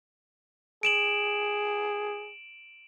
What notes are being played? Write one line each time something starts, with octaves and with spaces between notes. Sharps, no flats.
G#4 D7 E7 F#7